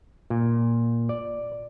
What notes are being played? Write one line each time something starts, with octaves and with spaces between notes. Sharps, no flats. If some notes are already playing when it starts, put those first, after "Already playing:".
A#2
D5